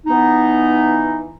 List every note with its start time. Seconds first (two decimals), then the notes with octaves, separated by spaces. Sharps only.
0.06 E3 B3 D#4